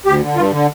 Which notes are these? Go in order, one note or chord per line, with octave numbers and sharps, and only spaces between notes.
D2 G4
D3
G2 F4
D3